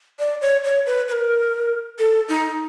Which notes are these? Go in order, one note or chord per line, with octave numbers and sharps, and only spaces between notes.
D5
C#5
C#5
B4
B4
A#4
A4
D#4